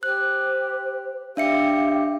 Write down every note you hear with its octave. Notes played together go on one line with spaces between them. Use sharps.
G4 C5 F#6
D4 G4 E5 F5 C#7